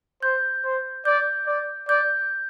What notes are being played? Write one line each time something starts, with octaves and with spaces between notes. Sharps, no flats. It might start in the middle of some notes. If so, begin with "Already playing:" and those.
C5 G6
C5
D5 G6
D5
D5 G6